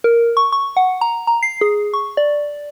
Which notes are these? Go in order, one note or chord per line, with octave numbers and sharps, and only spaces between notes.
A#4
C#6
C#6
F#5
A#5
A#5
C7
G#4
C#6
D5